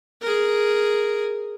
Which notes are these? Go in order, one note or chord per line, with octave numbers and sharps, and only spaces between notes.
G#4 A#4